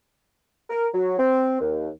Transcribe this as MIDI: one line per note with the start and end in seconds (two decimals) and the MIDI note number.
0.70 0.87 70
0.93 1.14 54
1.18 1.58 60
1.60 1.89 39